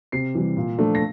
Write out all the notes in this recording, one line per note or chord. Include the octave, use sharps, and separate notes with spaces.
C3 C7
E3 G3
A#2
F3 A3 D4
A#6